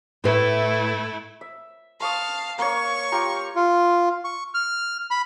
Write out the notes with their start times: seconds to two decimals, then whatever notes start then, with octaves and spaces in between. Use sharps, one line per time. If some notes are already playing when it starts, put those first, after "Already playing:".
0.24 A2 A3 E4 B4
1.41 E5
2.00 F5 A5 C6 C#6 D#6
2.59 A#3 C#5 C#6
3.12 F4 G4 A#5
3.56 F4
4.25 C#6
4.54 F6
5.11 B5